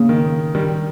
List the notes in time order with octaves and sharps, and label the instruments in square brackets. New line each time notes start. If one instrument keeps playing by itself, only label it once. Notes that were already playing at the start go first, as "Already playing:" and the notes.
Already playing: [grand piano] C#3 [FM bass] A#3
[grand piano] D#3
D#3 G3